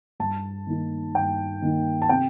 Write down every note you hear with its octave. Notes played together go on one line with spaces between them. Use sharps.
G2 A5
D#3 A#3 D#4
G2 G5
D#3 A#3 D#4
A5
C3 G5